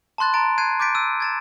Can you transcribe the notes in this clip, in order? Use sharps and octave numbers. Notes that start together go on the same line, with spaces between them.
A5 B5 C6 F#6 A6
A5 A#5 A6 D7
F#6 G#6 C7 D#7
D6 F#6 G6 A6 B6 D7
E6 F#6 D#7
G#6 A6 E7